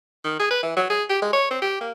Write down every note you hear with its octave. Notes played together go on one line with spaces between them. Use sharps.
D#3
G#4
B4
E3
F#3
G#4
G4
G#3
C#5
C4
G4
A#3